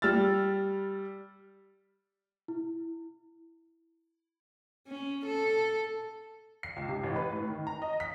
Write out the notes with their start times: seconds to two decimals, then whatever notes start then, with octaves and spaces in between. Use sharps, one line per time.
0.02 G3 E6 F6 A6
2.48 E4
4.87 C#4
5.26 A4
6.63 C7
6.76 C#2
6.88 C3
7.03 A1
7.16 B4
7.31 A2
7.49 D#3
7.67 A#5
7.82 D#5
8.00 B6